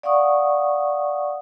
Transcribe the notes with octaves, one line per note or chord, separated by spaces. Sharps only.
D5 F5 F#5 C#6 D#6